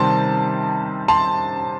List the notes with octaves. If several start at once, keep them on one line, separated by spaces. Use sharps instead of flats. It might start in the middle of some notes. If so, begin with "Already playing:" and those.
Already playing: C3 D#3 G3 C4 A5 C6
A5 C6